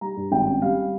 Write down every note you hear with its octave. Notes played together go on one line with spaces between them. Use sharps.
G3 A#5
G2
G#1 G5
C#4
G3 F5